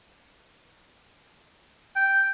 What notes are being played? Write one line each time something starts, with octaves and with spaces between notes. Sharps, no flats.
G5